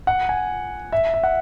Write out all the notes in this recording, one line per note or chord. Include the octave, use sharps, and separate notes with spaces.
F#5
G#5
E5
E5
F#5